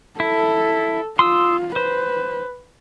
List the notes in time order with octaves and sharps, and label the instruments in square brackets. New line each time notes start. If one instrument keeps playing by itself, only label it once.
[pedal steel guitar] E4 [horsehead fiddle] A4
[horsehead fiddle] F4 [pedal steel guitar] C6 D#6 E6
[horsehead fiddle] B4 [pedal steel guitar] C5